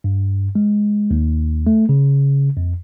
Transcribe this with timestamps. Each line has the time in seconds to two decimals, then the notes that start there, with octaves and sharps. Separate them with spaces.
0.04 G2
0.55 G#3
1.11 D#2
1.67 A3
1.89 C#3
2.57 F2